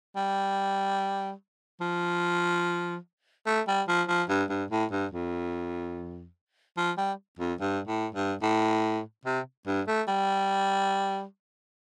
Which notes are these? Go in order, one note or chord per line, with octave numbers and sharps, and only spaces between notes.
G3
F3
A3
G3
F3
F3
G2
G2
A2
G2
F2
F3
G3
F2
G2
A2
G2
A2
C3
G2
A3
G3